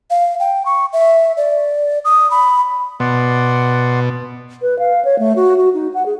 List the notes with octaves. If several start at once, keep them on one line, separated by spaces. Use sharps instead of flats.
F5
G5
C#6
E5
D5
D#6
B5
B2 D5 F#5 C6
B4
F5
C#5
A3
F#4
F#4
D#4
F#5
G#4